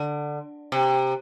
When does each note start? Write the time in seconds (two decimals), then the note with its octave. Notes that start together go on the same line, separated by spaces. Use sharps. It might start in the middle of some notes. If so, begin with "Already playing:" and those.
Already playing: D3
0.72 C3